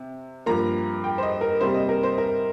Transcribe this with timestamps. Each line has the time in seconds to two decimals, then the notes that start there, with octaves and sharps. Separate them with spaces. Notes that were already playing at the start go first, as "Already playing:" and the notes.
Already playing: C3
0.46 G2 F3 A#3 A#5
1.04 G5
1.18 C5
1.23 D#5
1.41 A#4
1.61 C3 G3 A#3 C5
1.74 D#5
1.89 A#4
2.03 C5
2.18 A#4